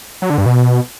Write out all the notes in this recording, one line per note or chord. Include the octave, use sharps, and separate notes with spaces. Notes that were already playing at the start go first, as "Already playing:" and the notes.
F#3
D3
G2
B2